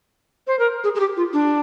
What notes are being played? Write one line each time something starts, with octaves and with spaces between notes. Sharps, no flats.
C5
A#4
G#4
G#4
G4
F4
D4